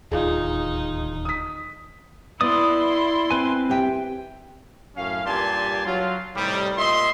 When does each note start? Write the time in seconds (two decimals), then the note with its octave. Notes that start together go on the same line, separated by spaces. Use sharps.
0.12 D1 D#2 D#4 F4 G#4
1.25 D#6 B6
2.41 B3 E4 D5 C6 D#6
3.31 C4 B4 G#5
3.69 G4 E5 G5
4.95 F#2 A2 C#4 F5
5.24 G2 A#2 G4 G#5 A5 C6
5.85 F#3 F4
6.35 A2 C3 D#3 G3
6.78 A#2 D#5 E5 C6